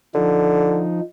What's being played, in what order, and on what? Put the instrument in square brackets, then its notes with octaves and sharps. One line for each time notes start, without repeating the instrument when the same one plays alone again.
[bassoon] D3 [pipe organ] F3 D#4